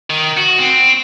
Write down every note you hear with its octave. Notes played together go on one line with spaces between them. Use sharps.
D#3
F#4
C4